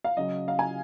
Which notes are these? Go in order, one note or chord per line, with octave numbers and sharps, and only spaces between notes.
F5
C#3 F#3 D#5
F5
G#5